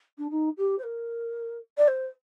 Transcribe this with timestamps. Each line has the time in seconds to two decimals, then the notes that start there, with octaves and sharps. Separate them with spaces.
0.18 D4
0.31 D#4
0.57 G4
0.79 C5
0.84 A#4
1.78 D5
1.88 C5